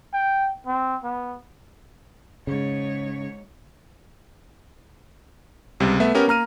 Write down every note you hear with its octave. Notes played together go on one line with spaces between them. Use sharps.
G5
C4
B3
G#2 C#3 C#5
C#2 C3 G3
A3 B3 E5
B3 C#4 G4 A#4
A#3 A#5 F6 D#7